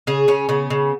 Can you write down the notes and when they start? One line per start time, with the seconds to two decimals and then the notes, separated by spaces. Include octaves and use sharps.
0.07 C#3 G#4
0.28 C#3 C#4
0.49 C#3 B3
0.70 C#3